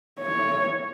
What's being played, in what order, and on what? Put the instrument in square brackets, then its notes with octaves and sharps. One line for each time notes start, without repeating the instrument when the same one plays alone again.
[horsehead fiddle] C#5